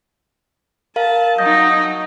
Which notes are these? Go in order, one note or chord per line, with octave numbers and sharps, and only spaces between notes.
A#4 F5 A5
F#3 D#4 D#5 G6